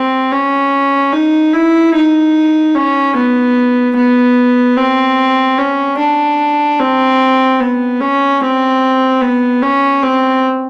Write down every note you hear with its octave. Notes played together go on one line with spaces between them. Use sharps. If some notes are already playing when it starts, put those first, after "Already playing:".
Already playing: C4
C#4
D#4
E4
D#4
C#4
B3
B3
C4
C#4
D4
C4
B3
C#4
C4
B3
C#4
C4